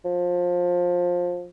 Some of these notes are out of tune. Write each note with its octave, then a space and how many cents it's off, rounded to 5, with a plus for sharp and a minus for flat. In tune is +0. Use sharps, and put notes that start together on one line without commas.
F3 +20